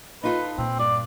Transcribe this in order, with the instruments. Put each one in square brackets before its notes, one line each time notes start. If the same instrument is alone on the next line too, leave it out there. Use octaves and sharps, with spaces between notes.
[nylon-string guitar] D#4 F4 A4 [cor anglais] B4
[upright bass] A#2 [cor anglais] C4
[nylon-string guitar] G2 [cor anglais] D5